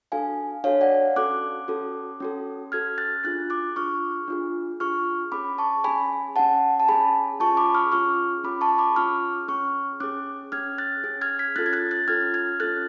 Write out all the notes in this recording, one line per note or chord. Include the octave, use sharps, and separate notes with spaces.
D4 F#4 A4 F5 G#5
D4 F#4 A4 C#5 F5
D5 F#5
C#4 F#4 A4 D6 F#6
C#4 F#4 A4
C#4 F#4 A4
C#4 F#4 A4 F6 G#6
F#6 A6
D4 F4 G#4 F#6 A6
D6 F#6
D4 F4 G#4 C#6 F6
D4 F4 G#4
D4 F4 G#4 C#6 F6
C#4 G#4 B5 D6
A5 C#6
C#4 G#4 G#5 B5
C#4 G#4 F#5 A5
A5
C#4 G#4 G#5 B5
C#4 F4 G#4 A5 C#6
B5 D6
C#6 F6
C#4 F4 G#4 C#6 F6
C#4 F4 G#4 B5 D6
A5 C#6
B5 D6
C#4 F4 G#4 C#6 F6
C#4 G#4 C#6 F6
C#4 G#4 D6 F#6
C#4 G#4 F6 G#6
F#6 A6
C#4 G#4
F6 G#6
G#6 B6
C#4 F4 A4 F#6 A6
G#6
F#6 A6
F#6 A6
C#4 F4 A4 F6 G#6
F6 G#6
C#4 F4 A4 F#6 A6